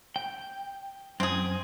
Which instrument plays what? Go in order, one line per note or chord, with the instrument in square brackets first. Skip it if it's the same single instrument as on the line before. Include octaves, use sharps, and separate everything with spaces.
[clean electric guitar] G5
[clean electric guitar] F#2 G#5 [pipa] C4 G#4